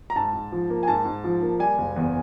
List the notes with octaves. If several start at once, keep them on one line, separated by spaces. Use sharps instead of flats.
A#5
G#2 A5
G#2
F3
A#3
G#5
G#2 A5
G#2
F3
A#3
G3 G#5
F#1
E2